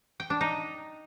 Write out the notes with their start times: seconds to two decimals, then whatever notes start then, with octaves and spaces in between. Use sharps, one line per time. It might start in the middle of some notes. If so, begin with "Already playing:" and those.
0.20 G5
0.30 D4
0.41 D#4